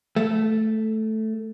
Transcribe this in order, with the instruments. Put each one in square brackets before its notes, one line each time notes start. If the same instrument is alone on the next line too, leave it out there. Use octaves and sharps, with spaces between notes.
[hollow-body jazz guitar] A3